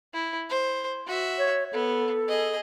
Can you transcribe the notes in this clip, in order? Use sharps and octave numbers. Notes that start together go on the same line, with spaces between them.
E4
C5
F#4 E5
C#5
B3 A4
G#4 D#5